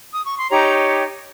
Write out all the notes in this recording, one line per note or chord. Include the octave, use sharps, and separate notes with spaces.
D#6
C#6
C6
D#4 G4 C#5 A#5